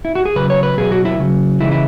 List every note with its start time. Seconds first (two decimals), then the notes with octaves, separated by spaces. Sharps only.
0.05 E4
0.15 F#4
0.25 G#4
0.36 C#3 F#3 B4
0.50 C#5
0.63 B4
0.77 B2 F#3 G#4
0.91 F#4
1.05 E4
1.19 C#3 F#3
1.61 C#3 E3 G#3 E4
1.72 E4